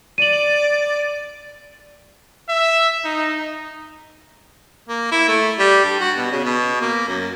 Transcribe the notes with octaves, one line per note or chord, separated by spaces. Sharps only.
D5 D#7 F#7
E5
D#4
A#3
E4
A3
G3
G2
F#4
B2
C#3
B2
A#3
F#2